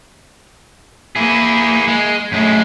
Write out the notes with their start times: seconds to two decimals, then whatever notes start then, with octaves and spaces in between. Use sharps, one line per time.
1.16 A#3 E4 G#4
1.88 G#3
2.32 F#2 G#3 A3